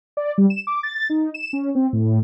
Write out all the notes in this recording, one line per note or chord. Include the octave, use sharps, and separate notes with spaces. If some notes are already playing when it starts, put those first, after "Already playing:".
D5
G3
E7
D6
A6
D#4
E7
C#4
C4
A2